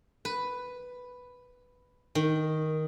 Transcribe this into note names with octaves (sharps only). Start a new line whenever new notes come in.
B4
D#3